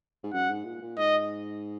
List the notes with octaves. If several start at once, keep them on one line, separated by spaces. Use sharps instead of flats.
G#2
F#2 F#5
G#2
A#2
A#2
G#2 D#5